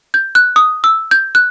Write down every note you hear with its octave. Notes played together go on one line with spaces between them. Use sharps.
G6
F#6
D#6
E6
G6
F#6